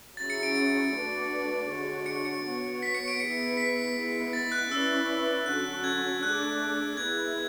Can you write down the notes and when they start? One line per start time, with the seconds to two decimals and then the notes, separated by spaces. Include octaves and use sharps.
0.17 F#3 C#4 E4 G#4 A6
0.30 C#7
0.43 D7
0.56 D7
0.93 A3 D4 F#4 B4 D5
1.68 D3 G#3 D4 F#4 C#5
2.06 C#7
2.25 C#7
2.44 B3 F#4 C#5
2.83 B6
2.95 C#7
3.08 D7
3.20 E3 B3 E4 G#4 C#7
3.57 B6
3.95 G#3 B3 E4
4.33 A6
4.52 F#6
4.71 C#4 E4 B4 D5 E6
5.46 D3 F#3 C#4 F#4 A4 F#6
5.84 G#6
6.23 A3 D4 G#4 D5 F#6
6.97 G#3 B3 E4 G#6